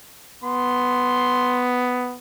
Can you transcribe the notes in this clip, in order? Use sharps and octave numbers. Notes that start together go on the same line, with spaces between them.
B3 C6